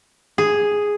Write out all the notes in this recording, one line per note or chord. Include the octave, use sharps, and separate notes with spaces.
G#4